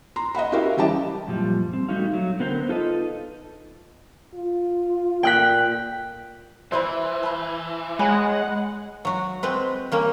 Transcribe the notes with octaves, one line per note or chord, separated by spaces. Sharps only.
A#5 C6
D#5 E5 F#5 B5
E4 F#4 G4 A#4 E5 F5
E3 G3 C#4 G4 D#5 A5
F#2 A#2 F3 G3
C4
G3 A3 D#4 F#4 F5
F#3
D3 B3 A#4 C5 D#5 G5
D#4 F4 A4 B4 D#5
F4
A#2 G5 F#6 B6
E3 E4 B4 C5 B5
A5 B5
G#3 C#5 F#5 G#5 B5
F#3 F#4
G#3 C4 B4
G3 A#3 C#4